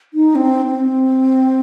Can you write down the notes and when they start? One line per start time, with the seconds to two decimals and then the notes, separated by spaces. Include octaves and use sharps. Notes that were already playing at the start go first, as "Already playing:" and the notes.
0.14 D#4
0.35 C4
0.66 C4